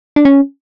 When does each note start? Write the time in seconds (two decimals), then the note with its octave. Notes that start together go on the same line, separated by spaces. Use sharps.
0.16 D4
0.25 C#4